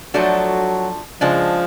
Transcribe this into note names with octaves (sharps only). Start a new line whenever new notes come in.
F3 F#3 A3 D4 F#4 A4
C#3 F3 G#3 D4